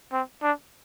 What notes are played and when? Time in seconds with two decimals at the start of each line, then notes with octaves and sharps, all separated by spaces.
0.12 C4
0.43 D4